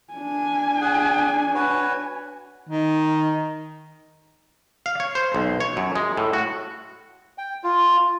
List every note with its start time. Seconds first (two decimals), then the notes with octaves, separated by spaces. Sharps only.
0.13 D4 G#5
0.81 G#4 F#5
1.55 F#4 B4 C#5
2.69 D#3
4.86 F5
5.00 C#5
5.15 C5
5.34 B1
5.60 C#5
5.77 F#2
5.95 G#3
6.17 A2
6.33 F#4
7.38 G5
7.64 F4